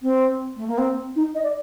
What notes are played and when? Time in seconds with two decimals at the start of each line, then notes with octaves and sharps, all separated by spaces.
0.02 C4
0.56 A3
0.68 A#3
0.78 C4
1.16 D#4
1.35 D#5
1.43 D5